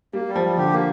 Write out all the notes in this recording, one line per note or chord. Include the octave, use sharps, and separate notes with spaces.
G3 A#3
G3
F3
G3
D3 G4
A#3